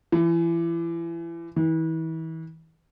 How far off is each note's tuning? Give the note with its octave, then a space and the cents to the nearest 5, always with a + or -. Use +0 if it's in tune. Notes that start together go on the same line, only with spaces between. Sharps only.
E3 +30
E3 -35